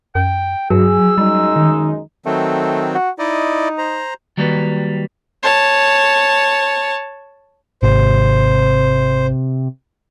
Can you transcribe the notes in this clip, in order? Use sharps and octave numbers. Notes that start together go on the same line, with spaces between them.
F#2 G5
G2 F#3 G#4 E6
F#2 G3 G#3 D#4
D#3
D#3 F#3 A3 C4
F#4
D#4 E4 D5 D#5
C5 A#5
D#3 F#3 G3 A#3 B4
C#5 A5
G#1 C3 C5